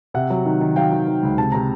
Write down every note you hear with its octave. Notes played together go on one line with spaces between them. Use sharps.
C3 E5 F#5
F#3
D#3
D#3
F#3 F5 G5
D#3
D#3
C#2
C3 A5
C3 A#5